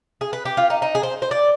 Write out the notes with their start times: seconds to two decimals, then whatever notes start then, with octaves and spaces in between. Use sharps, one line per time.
0.21 G#4
0.33 B4
0.45 G4
0.57 F4
0.70 D#4
0.82 D#4
0.95 G#4
1.03 C5
1.22 C5
1.31 D5